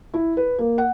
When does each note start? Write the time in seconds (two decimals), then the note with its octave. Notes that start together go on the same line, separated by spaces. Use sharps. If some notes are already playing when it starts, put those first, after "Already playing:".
0.14 E4
0.37 B4
0.58 A#3
0.78 F#5